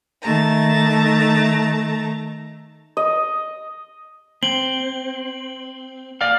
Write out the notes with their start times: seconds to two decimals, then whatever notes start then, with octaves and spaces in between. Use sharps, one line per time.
0.22 D#3 A3 A5 A#5
2.97 D#5
4.43 C4 F#7
6.21 D5 F5